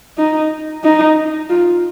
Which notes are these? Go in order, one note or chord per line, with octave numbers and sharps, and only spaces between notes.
D#4
D#4
F4